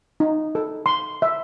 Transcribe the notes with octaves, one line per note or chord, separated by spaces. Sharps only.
D#4
A4
C6
E5